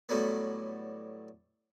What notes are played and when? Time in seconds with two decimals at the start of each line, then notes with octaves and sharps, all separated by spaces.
0.09 A2 D3 F#3 G3 B3